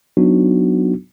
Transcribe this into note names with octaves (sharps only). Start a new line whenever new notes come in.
F#3 B3 D4 D#4 F#4